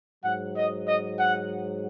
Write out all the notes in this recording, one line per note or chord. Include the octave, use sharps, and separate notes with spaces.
G#2 F#3 F#5
D#5
D#5
F#5